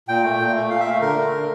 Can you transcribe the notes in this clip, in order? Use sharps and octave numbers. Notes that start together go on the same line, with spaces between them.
A#2 G5
A3
A#2
A3
A#2 F5
E5
A3 F5
D3 A#4
A3
D3